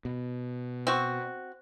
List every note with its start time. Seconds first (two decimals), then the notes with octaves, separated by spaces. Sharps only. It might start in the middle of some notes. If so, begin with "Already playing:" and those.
0.05 B2
0.87 C4 F#4